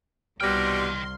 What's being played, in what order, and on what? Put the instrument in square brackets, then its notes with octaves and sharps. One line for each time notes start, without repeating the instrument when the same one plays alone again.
[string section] C2 C6 [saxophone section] B2 G3 [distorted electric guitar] D#5 G5 [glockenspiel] F6